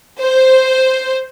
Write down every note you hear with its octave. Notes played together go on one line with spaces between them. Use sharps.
C5